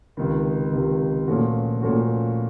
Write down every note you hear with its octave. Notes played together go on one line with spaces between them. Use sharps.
C#2 C3 D#3
C#2 C3 D#3
A#2 F3 A3 C#4 F#4
A#2 F3 A3 C#4 F#4